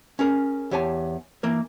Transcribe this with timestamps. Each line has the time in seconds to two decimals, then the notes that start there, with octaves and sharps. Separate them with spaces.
0.19 C#4 G#4 A#4
0.71 E2 G4 C#5 G#5 A5
1.43 E3 A#3 A#4